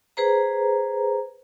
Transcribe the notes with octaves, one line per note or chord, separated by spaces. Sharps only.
G#4 B4 C5 A#5